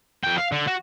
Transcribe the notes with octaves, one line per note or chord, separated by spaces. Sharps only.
F2 G5
F5
D3
F#4